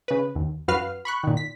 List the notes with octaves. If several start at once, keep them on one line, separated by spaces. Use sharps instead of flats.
C#3 B4
D#2
F#2 F#4 B4 F5 F6 C7
B5 C#6 F#6
A#2 D#3
B6